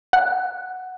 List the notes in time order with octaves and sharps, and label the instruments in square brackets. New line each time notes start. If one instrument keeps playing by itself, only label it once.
[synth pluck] F#5